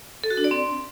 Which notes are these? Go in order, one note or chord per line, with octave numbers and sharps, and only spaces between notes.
A4
F#4
D4
D5
C4